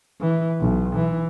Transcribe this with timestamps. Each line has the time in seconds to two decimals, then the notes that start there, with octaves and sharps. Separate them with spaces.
0.20 E3
0.61 B1
0.96 E3